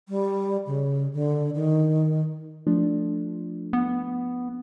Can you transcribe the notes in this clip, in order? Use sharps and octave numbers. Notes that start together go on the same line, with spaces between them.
G3
C#3
D3
D#3
F3 A3 D4
B3